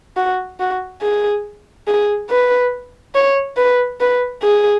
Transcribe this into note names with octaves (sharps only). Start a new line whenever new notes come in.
F#4
F#4
G#4
G#4
B4
C#5
B4
B4
G#4